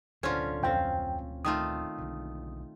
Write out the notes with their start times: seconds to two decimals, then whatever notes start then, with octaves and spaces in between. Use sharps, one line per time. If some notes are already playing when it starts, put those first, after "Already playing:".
0.23 D1 D2 B2 D3 C#4 F4 C5
0.63 F2 F3 C4 C5 G5
1.45 D#3 A3 F4 D#6
1.98 B1 D3